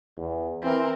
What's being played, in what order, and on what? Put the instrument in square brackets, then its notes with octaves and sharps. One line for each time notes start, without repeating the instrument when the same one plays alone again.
[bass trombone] E2
[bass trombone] E3 [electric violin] C4 A#4